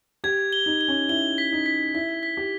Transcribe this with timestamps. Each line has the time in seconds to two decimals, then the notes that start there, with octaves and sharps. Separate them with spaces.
0.24 G4 G#6
0.53 G7
0.66 D#4
0.81 G7
0.88 C#4
1.09 E4 G7
1.38 B6
1.52 D#4
1.66 B6
1.95 E4 B6
2.23 B6
2.37 G4